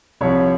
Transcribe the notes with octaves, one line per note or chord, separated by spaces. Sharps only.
C2 C3 F3 C#5